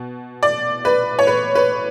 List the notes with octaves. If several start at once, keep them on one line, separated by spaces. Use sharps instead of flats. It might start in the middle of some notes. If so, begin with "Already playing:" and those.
Already playing: B2
D5
B4
C#5
B4
B4